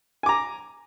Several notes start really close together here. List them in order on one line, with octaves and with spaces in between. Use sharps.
G#5 D6 A#5